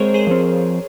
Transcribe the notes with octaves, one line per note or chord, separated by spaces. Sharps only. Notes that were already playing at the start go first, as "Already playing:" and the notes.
Already playing: G#3 C4 G#4 A#4 C5 C#5
G#4 C5
F3 C4